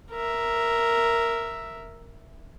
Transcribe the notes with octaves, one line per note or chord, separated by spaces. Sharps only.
A#4 E5